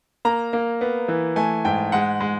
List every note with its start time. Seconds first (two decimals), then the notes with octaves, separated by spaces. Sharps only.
0.25 A#3 A#5
0.53 A#3
0.81 B3
1.08 E3
1.36 A3 G#5
1.65 G#2 G5
1.92 G#3 F#5
2.20 G#3